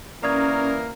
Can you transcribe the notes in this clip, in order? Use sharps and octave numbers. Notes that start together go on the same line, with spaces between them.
E3 A#3 C#4 A#4 D5 D#6 G#6